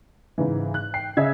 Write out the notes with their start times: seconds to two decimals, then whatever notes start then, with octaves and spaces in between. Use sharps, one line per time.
0.38 G#2 C#3 E3
0.74 F#6
0.94 G5 C7
1.17 C#3 D#5 E5 G#6